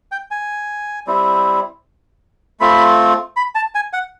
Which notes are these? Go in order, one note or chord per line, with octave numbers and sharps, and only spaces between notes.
G5
G#5
G3 C4 E4
A3 C4 F4 B5
B5
A5
G#5
F#5